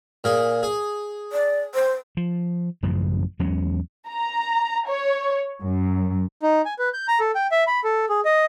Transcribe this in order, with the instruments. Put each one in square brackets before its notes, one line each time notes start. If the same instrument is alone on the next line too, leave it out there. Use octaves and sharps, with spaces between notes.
[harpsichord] A#2 G#4
G#4
[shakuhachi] D5
C5
[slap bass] F3
A1 F#2 C#3 F3
E2 F#3 G#3 C#4
[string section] A#5
C#5
F#2
[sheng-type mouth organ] D#4
G#5
B4
G6
A#5
A4
G5
E5
B5
A4
G#4
D#5